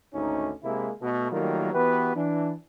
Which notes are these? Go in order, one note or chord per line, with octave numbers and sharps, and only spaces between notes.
G#1 D2 C#4 D#4
C3 G#3 A#3 E4
B2 A3
D#3 F#3 G3 A3 A#3 F4
E3 B3 F#4 G4 B4
E3 D4